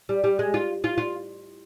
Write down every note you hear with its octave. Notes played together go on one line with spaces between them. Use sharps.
G3
G3
G#3
F4
F4
F4